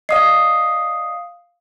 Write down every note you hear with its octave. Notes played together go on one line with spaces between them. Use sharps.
D5 D#5 F5 D#6 C7